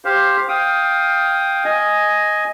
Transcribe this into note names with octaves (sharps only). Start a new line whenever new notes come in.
G4 C5 F5
F5 G5 D#6
D#5 G#5